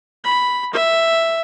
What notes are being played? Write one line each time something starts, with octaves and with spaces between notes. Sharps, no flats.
B5
E5